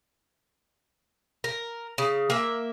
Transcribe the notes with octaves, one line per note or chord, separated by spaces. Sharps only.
A#4
C#3
A#3 E5